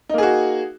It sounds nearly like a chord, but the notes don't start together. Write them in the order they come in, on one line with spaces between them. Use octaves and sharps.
D#4 A#3 G#4 F#4